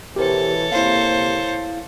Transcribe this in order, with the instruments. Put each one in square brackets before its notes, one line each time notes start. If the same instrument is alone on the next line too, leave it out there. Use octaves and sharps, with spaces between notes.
[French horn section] B2 E3 [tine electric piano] G4 A#4 C5 [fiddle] A4 C#5
[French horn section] C3 A#3 [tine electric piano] E4 F5 [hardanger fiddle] C5